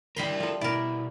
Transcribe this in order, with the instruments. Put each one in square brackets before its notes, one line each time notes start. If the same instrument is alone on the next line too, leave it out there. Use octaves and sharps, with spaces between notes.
[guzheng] G3 B5 C6 [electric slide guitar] E4 A#4
[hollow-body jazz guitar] F3 A4
[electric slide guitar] B2 [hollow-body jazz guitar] E4 [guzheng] A#4 D5